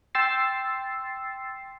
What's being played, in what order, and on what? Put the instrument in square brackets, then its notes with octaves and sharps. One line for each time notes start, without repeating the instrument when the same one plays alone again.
[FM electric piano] G5 C6 E6 A6 C7